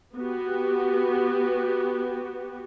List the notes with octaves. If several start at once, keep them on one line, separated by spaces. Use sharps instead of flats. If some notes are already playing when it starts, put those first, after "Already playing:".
B3 F#4 G4